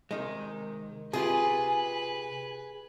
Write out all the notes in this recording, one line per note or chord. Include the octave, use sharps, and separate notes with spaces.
C3 D#3 G#3
C3 F4 G4 G#4 B4 G#5